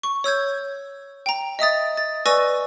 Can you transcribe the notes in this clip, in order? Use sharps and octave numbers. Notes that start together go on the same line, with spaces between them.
C#6
C#5 E6 G6 G#6
G5 A#5
D#5 E5 D#6 A6
A6
B4 D5 G#5 C#6 E6 A#6